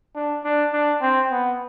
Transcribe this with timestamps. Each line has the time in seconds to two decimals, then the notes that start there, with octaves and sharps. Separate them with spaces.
0.16 D4
0.44 D4
0.73 D4
1.02 C4
1.31 B3